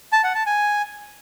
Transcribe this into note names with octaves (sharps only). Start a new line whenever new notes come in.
A5
F#5
A5
G#5